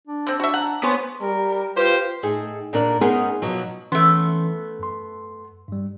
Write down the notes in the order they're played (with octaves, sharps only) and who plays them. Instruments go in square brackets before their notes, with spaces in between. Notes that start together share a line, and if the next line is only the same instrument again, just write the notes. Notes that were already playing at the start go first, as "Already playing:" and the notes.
[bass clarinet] D4
[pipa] D3 C4
[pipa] F#4 E5 [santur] A5
[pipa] F#5 [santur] A#5
[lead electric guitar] B3 [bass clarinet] C5 [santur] C#5 G#5
[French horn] G3 [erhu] A#4
[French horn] F4 [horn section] G4 C5 [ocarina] B4 [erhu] F5
[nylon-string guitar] A2 D#4 G#4
A#2 A#3 D4 A#4 D5
B3 C#4 D#4 G#4 A#4 C5
B2 F3 F#3
[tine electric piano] E3 C#4 C6 [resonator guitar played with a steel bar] A3 B3
[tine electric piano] F#2 C6
G2 G3